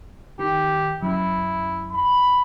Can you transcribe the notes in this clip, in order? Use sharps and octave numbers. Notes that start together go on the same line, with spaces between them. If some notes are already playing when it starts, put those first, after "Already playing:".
D#3 G4
F#2 E4
B5